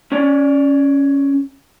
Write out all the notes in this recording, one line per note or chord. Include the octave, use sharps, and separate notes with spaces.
C#4 C#5 D5 G#5